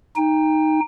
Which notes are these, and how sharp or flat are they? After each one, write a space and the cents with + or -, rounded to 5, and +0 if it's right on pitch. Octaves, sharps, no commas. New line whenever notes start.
D#4 +0 G5 +30